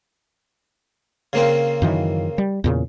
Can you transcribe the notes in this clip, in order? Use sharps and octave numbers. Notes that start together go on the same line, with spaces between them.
C#3 A#3 C4
F#2 D#3 E3
G3
E2 A#2 C#3